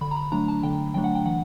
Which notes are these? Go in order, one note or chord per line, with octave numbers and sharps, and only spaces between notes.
D3 B5
A#5
B5
F#3 A3 D4 A#5
A5
D3 G5
F#3 A3 D4 G5
F#5
G5
E3 F#5